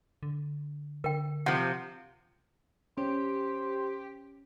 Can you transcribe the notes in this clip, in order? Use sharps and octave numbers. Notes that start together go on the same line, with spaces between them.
D3
D3 A#4 G5
C3 F3 F#5
C#4 G4 C5